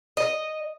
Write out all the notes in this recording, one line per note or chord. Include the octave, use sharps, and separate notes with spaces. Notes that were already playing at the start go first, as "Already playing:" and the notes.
D#5